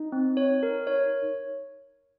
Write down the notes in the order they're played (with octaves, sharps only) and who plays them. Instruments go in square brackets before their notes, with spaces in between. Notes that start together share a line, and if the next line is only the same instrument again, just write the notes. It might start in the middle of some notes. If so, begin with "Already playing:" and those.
Already playing: [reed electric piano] D#4
[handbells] C4
C#5
A#4
C#5